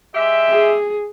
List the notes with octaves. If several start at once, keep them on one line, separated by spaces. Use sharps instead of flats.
G#3 G4 E5
G#4